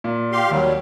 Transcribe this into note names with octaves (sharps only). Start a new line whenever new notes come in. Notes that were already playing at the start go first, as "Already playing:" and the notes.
A#2
G4 F5 C6
D#2 F#3 G3